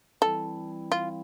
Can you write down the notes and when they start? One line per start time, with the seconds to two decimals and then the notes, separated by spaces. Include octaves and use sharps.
0.22 E3 G3 C4 E4 A4
0.92 F4